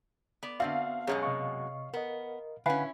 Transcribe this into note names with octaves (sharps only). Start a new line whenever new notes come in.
B3 D5
D3 B3 C4 F#4 D5 E5 F5
F#2 B2 G#3 G#4 C#5
C3 D#5 C#6
B3 A#4 D#5
D3 C#4 E4 B4 F5 F#5 G#5 B5